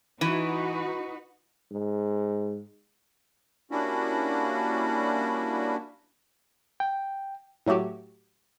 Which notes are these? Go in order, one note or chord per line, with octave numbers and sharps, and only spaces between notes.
E3 D#4 F#4 B4
G#2
G3 A#3 C#4 D4 E4 F#4
G5
A2 F#3 A3 F#4 G4